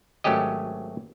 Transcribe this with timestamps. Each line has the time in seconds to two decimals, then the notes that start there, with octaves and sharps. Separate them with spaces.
0.24 G#1 F#3 A3 C#4 G4 D#5